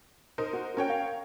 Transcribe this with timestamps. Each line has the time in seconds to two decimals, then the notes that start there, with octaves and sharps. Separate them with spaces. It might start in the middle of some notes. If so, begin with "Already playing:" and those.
0.38 D#4 A#4 C5
0.53 F#4
0.77 C#4 F#4 A#4 C#5 G5
0.89 F5